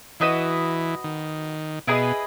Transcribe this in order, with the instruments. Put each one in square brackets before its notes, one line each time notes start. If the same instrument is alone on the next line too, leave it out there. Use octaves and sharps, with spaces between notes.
[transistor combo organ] E3 [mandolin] F#4 B4 D#5
[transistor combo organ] D#3
[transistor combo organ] B2 [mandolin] E4 G#4 B4 D#5